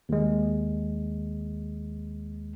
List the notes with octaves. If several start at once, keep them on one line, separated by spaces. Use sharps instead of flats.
D#2 G#3